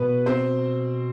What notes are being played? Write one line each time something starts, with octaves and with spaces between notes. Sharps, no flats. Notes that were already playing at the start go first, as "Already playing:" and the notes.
Already playing: B2 B3 B4
C4 C5